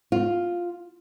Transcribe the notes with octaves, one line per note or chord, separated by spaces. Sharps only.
F4